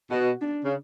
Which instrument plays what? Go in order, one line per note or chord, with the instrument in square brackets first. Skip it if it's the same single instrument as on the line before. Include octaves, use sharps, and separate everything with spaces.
[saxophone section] B2 [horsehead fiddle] F#4
[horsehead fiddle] D4
[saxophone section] C#3